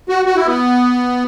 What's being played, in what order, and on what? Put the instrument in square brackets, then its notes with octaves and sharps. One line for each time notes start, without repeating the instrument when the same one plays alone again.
[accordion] F#4
F#4
E4
B3